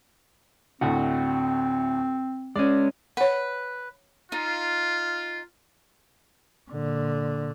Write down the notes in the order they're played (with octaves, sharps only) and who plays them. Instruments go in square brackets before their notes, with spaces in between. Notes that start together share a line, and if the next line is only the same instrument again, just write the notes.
[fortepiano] D2 A2 [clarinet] C4 [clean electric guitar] F#4
[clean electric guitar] G#3 C#4 [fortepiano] D5
[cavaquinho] B4 [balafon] C#5 F#5
[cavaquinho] D#4 [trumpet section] F4
[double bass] A#2 D3